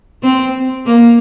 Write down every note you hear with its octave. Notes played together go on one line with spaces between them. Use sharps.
C4
A#3